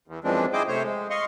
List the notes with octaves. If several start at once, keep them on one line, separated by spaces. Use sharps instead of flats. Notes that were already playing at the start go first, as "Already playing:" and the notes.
E2
F#2 E3 F3 G#3 C4 D4
E4 G#4 C5 D#5 G5 D6
C3 A3 C5 C#5
G#3
D#5 F5 C6 C#6